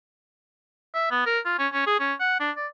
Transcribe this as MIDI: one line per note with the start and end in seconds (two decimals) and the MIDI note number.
0.94 1.06 76
1.11 1.25 59
1.26 1.39 70
1.45 1.57 65
1.59 1.67 61
1.73 1.83 61
1.87 1.99 68
2.00 2.14 61
2.20 2.39 78
2.40 2.51 62
2.56 2.67 74